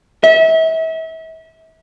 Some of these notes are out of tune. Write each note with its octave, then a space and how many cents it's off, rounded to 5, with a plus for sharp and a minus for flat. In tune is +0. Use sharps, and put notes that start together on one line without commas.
E5 -35